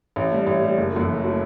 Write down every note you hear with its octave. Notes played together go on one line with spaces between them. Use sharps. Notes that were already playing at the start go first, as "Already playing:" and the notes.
A1
A2 G3
A1
A2 G3
F#1
F#2 F#3 A3
F#1
F#3 A3